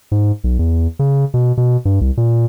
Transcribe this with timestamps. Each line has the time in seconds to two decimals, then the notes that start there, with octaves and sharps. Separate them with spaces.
0.11 G#2
0.44 B1
0.59 E2
0.99 C#3
1.34 B2
1.57 B2
1.85 G2
2.01 C2
2.17 A#2